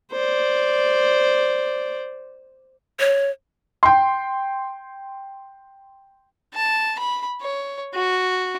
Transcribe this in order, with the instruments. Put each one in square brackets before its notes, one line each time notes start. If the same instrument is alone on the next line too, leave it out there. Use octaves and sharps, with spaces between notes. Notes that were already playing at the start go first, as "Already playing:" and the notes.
[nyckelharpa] C5 D5
[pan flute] C#5
[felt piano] G5 C6
[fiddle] A5
B5
C#5
F#4